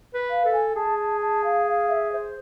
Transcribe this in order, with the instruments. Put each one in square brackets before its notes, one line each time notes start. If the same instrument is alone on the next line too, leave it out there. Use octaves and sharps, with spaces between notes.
[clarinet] B4
[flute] F5
[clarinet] A4
[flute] G#5
[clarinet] G#4 [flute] A5
[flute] A5
A5
F5
F5
E5
C5